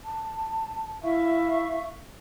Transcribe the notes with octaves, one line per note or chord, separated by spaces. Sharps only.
A5
E4 E5 F5 C#6